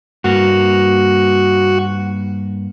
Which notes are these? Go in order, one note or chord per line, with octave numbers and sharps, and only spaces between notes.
G2 A#3 F#4